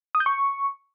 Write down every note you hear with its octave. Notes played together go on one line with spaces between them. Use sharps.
D#6
G6
C#6